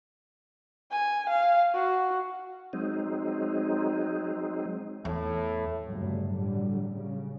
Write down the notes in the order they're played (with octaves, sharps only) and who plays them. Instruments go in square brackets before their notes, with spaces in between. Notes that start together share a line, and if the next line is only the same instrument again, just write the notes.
[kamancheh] G#5
F5
F#4
[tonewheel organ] F#3 G#3 C4 D#4
[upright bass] E2 [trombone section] A2
[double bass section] G1 G2 A#2 C#3 F#3 A3
A2 D3 F#3 G3
C#3